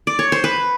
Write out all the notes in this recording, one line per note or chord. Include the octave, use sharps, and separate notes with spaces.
D5
C#5
C5
B4